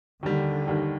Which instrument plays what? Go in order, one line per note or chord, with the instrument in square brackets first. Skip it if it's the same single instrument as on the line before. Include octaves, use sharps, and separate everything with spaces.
[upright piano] D#2 D#3 G3 [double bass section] D3
[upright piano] D#2 D#3 G3